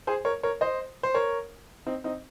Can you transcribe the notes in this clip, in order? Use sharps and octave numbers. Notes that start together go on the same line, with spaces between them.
G#4 C5
A#4 C#5
A#4 C#5
C5 D#5
C5
A#4 C#5
C4 D#4
C4 D#4